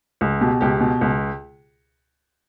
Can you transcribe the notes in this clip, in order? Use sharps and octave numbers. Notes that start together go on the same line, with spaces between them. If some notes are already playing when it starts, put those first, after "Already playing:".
C#2
B2 G4
C#2 G4
B2
C#2